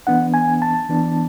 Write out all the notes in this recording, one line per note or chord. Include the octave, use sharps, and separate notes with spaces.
E3 B3 D4 F#5
G#5
A5
E3 B3 D4